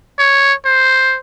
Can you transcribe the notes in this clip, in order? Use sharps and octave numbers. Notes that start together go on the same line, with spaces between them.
C#5
C5